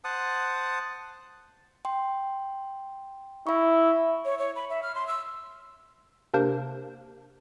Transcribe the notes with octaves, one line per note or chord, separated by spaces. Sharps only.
C5 F#5 A5 D#6
G5 C6
E4 E5 C#6
C#5
C#5
B5
E5
F6
C6
E6
C3 A#3 D4 A#4 C5